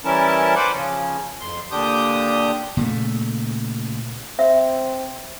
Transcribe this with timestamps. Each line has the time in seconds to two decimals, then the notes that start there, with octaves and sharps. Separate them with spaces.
0.05 E3 G3 C#4 E4 A#4 A5
0.56 B4 C5 D5 F#5 D6
0.72 C#3 F3 C#4
1.41 F2 C6
1.71 A#2 D3 D4 G4 D#6 G6
2.77 A#2 C#3 A3
4.39 C4 E5